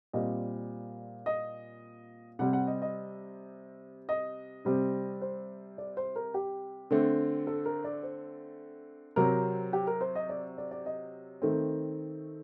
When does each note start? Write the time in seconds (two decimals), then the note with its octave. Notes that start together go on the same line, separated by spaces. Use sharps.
0.13 A#2 G3 C4 D#5
1.26 D#5
2.39 C3 G3 C4 F#5
2.53 F#5
2.67 D#5
2.82 D#5
4.09 D#5
4.65 C3 G3 C4
5.21 C5
5.78 D5
5.97 C5
6.16 A#4
6.34 G4
6.91 D3 A3 C4
7.47 A4
7.66 A#4
7.84 D5
8.03 C5
9.16 C3 F#3 C4 A#4
9.73 G4
9.87 A#4
10.01 C5
10.15 D#5
10.29 D5
10.58 D5
10.71 D5
10.86 D#5
11.42 D#3 A3 C4